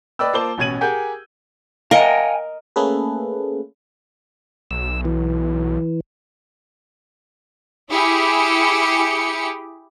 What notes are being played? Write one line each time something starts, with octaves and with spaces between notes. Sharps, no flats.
B4 D5 D#5 G5 E6
A#3 F4 C5 A5 D6 G7
A1 B2 C#4 G#6 D#7 F#7
G4 G#4 A#4 F#5 G#5 G6
A#4 D#5 F5 G5 G#5
A3 A#3 C#4 G#4 A4 B4
B1 E6
E3
E4 G4 G#4 C#7